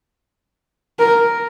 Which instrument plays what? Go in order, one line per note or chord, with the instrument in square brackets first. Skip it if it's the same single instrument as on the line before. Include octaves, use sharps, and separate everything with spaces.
[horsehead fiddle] A#4